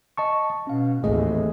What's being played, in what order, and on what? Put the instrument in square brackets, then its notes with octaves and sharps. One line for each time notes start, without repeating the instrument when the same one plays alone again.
[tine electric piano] D#5 A5 C#6
[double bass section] B2 [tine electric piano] C#4 F5
[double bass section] G#1 D#2 A2 [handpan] E3 A3 G#4 [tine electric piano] D#5